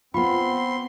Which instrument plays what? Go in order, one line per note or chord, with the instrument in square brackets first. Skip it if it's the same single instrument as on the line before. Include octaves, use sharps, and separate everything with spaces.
[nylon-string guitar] B3 F4 [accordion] C4 [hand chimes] B5 [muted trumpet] C6